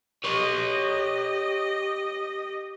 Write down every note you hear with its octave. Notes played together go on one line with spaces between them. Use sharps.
G4 B4 C#5 D#5